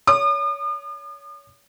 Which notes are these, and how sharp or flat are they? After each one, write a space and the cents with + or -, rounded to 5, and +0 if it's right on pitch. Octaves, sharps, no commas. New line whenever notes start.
C#5 +25 D#6 -45